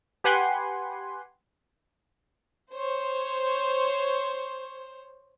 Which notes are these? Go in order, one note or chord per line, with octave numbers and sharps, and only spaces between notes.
G4 B4 F#5 G#5 C6
C5 C#5